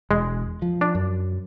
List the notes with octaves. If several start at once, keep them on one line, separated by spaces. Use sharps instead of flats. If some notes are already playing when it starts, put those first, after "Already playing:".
E1 G#3
F3
D4
F#2